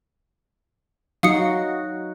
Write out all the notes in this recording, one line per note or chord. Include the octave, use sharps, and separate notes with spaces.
F#3 D#4 F#4 F5 D#6 C#7